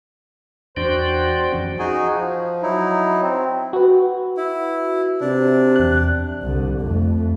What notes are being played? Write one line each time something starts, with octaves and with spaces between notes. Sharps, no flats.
E2 D4 F#4 C5 D5 G5
F2 E3 C#4
D#4 F#4 G#4 G#5
F3
F#3 D#4 E4
C4
F#4 B4
E4
C3 D4
E2 F#6
C2 D3
F2 A3